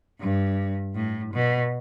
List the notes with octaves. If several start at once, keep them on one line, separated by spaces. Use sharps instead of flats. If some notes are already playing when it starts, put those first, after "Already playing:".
G2
A2
B2